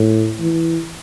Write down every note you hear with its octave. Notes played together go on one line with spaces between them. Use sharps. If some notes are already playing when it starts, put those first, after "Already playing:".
Already playing: A2
E3